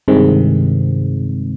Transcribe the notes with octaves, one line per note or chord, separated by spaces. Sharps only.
G2 C3 D#3 G#3 C4